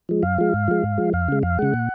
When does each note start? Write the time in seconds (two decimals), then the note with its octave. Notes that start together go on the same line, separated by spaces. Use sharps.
0.09 F3 G#3
0.23 F#2 F5
0.38 F3 G#3
0.54 G#2
0.68 F3 G#3
0.84 G#2
0.98 F3 G#3
1.13 F2 F5
1.28 C#3 G#3
1.43 F2 F5
1.59 C#3 G#3 F#5
1.74 A#2